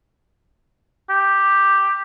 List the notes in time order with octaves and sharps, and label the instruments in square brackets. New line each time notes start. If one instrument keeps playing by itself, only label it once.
[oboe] G4